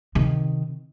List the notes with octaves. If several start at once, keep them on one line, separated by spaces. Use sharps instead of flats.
C3 D#3